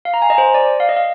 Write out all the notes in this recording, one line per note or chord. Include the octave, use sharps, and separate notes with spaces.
F5
A#5
G#5
D#5
C5
D5
F5
D#5
F5